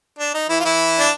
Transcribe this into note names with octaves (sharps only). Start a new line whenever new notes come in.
D4
D#4
E3 E4
F4
E3 E4
D4